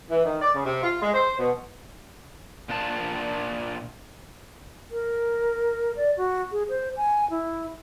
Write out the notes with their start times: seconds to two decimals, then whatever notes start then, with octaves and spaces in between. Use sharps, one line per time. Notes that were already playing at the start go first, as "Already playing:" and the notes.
0.10 E3
0.25 D#3
0.41 D5
0.53 C#3
0.65 C3
0.83 F4
1.01 G#3
1.13 C5
1.38 B2
2.69 A#2 D4 F4 A5
4.90 A#4
5.96 D5
6.17 F#4
6.52 G#4
6.69 C5
6.97 G#5
7.30 E4